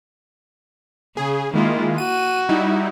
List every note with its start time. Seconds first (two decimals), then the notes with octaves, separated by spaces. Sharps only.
1.17 C#3 G#4
1.53 D#3 G#3 A#3 E4 F4
1.98 F#4 D#7
2.49 G3 D#4 E4